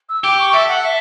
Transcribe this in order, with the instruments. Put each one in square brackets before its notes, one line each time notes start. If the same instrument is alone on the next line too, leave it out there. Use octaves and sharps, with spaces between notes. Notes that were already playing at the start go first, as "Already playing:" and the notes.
[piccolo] E6
[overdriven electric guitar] G4 [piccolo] D6
[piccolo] C#6
[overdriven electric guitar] A4 [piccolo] E5
[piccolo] F#5
E5